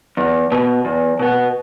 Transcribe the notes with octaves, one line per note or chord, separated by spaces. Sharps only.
E2
B2 B3
E2
B2 B3